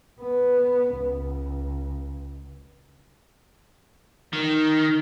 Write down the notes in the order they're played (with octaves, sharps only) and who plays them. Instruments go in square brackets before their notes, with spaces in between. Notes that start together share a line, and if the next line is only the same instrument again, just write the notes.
[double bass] B3
C#2
[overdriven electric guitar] D#3